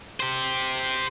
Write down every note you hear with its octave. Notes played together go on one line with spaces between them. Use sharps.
G4 C5